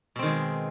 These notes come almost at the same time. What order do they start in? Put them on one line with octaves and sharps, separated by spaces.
B2 C4 D#3 G#3